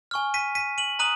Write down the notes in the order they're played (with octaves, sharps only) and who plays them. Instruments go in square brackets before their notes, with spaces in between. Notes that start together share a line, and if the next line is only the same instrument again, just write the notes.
[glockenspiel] G#5 C#6 F6
B6 D#7
B6 D#7
D#7 F#7
A#5 D#6 F#6 D#7 F#7